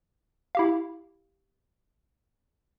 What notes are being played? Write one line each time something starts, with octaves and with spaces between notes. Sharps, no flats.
E4 G4 F5